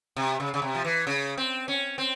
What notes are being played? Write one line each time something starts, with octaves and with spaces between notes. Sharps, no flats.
C3
C#3
C#3
C3
F3
E3
C#3
C4
C#4
C4